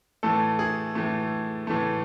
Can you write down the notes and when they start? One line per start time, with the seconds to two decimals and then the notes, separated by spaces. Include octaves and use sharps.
0.23 A2 E3 A3 A4
0.59 G#4
0.95 A2 E3 A3
1.67 A2 E3 A3